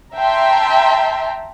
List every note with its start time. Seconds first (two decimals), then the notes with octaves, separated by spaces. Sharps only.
0.18 E5 G5 A5 A#5 C6